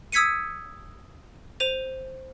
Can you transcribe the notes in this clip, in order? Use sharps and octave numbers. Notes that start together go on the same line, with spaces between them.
D#6 E6 G#6 B6 C#7 D#7
C5 D#7 F7